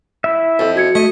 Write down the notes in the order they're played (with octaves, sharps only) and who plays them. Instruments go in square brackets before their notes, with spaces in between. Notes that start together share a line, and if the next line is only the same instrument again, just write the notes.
[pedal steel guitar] E4 E5
[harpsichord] F2
[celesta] F#4 G#6 C#7
[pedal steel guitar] A3 [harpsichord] D#5